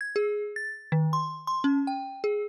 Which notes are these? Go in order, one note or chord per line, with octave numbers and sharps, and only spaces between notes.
G#6
G#4
A6
D#3
C6
C6
C#4
G5
G#4